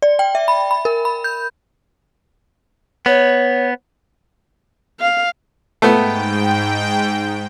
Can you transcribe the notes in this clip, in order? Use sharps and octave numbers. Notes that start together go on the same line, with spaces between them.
D5
G5
E5
B5
B5
A#4
B5
G6
B3 C#5
F5
G#2 A3 B3 G5